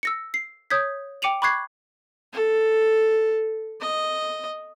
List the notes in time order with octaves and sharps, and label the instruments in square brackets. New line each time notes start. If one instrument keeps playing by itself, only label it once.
[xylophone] E6 A#6 C#7
C7
C#5 D#6 G6 G#6 B6
G5 D6 C#7 D#7 F7 F#7
B5 C#6 D6 F#6 G#6 C7
[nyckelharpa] A4
D#5